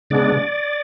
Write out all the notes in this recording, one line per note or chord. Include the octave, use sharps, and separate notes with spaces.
C#3 G#3 B3 D4 D5